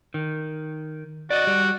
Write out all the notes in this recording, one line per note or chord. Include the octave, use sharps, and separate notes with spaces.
D#3
F#4 D5 D#5
G3